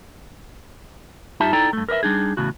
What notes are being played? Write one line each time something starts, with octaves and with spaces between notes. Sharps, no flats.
G2 D#4 F4 G4 E5 A5
D#4 E4 A4 D5 G5 A#5
G2 A3
A#4 B4 D5 E5
G3 D4 D#4 G#4
E2 A2 C#3 F#4